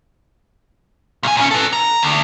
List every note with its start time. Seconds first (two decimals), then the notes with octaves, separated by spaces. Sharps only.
1.23 B1 G#5
1.37 A#2 C#4
1.51 A4 B4
1.73 A#5
2.02 D2